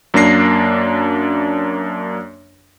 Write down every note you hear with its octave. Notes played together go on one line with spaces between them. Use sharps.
F#2 A#3 D4 A#6 C7